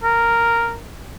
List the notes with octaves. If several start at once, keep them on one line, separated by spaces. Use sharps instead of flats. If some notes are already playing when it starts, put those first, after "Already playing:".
A#4